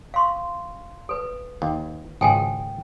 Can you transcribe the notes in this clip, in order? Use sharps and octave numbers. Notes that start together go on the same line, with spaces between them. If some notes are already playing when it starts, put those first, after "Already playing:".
F5 C6 C#6
A4 B4
D#2
G#1 C#2 G#4 A4 G5 G#5